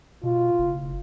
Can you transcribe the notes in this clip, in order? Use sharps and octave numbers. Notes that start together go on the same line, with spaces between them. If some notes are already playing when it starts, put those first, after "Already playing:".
B2 F4
F#1